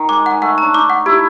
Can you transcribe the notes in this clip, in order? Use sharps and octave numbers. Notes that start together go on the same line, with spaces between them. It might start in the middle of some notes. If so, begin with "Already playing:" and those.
Already playing: D#3
G#3 D6
G#3 F#5
A3 F#5
D4 A#5
D#4 D6
F#5
E4 G4